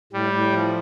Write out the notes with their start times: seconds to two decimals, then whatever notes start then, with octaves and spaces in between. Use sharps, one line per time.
0.13 A2 G3
0.33 A2
0.52 F3